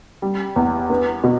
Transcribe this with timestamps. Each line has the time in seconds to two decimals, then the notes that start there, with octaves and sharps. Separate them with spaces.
0.22 G3
0.56 E2
0.90 B3
1.24 B2